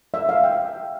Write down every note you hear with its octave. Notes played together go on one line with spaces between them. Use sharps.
E5
F5
G5